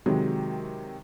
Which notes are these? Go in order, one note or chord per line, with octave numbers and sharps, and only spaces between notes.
C3 D#3 F#3 G#3